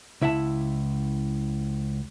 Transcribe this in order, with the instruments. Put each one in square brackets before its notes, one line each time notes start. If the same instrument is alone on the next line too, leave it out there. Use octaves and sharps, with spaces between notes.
[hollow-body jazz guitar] C#2 E4 E5 F#5 A5